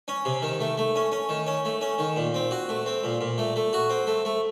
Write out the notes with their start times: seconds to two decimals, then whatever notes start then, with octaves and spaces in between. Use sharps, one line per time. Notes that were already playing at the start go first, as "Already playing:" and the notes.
0.08 C#4
0.25 C3
0.42 D#3
0.61 A3
0.78 A3
0.95 C#4
1.12 C#4
1.29 D#3
1.46 C#4
1.65 A3
1.81 C#4
1.99 D#3
2.16 A#2
2.34 C4
2.51 F#4
2.69 A3
2.86 C4
3.03 A#2
3.21 A#2
3.38 A3
3.56 A3
3.73 F#4
3.90 C4
4.07 A3
4.25 A3